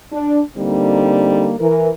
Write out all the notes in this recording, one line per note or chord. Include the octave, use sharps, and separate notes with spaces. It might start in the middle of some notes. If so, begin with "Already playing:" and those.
D4
D3 G3 A#3 C4 D#4
E3 A#4